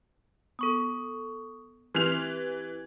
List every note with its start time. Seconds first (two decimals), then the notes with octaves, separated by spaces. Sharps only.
0.59 B3 A4 C#6 D#6
1.95 E3 C4 G4 F6 G6 F7